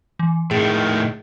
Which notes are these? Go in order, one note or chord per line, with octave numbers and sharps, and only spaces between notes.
E3
A2 D#3 G#4